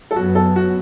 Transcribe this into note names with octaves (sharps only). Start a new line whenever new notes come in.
A4
F#2 F#3 B3 F#4
A4
F#4